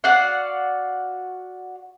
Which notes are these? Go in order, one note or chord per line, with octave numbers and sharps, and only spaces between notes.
F#4 D5 F5 F#5